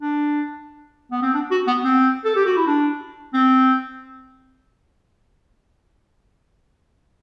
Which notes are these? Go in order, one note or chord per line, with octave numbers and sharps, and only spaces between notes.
D4
B3
C4
D4
F#4
B3
C4
A4
G4
F#4
E4
D4
C4